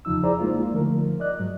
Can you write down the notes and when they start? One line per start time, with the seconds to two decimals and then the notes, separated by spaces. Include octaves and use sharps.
0.05 E2 C#3 F3 D#4 E6
0.23 E4 G#4 C5 D5 A#5
0.39 G#3 A#3 D#4 F4
0.72 D3 F3 A3 A#4
1.20 D5 D#5 F#6
1.40 G#2 F#3